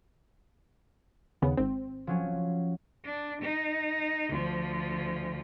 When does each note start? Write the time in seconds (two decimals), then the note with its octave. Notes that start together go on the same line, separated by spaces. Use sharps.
1.42 D#2 C#3 B3
1.57 G#1 C4
2.07 F3 F#3 C#4
3.05 D4
3.42 D#4
4.30 D2 F3